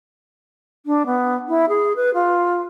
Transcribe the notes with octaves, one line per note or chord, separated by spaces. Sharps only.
D4
B3
E4
G#4
B4
F4